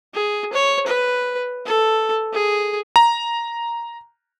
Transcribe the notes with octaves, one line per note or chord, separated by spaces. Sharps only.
G#4
C#5
B4
A4
G#4
A#5